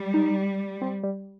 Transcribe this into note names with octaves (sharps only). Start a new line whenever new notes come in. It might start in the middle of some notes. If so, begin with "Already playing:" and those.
Already playing: G3
D#4
C4
G3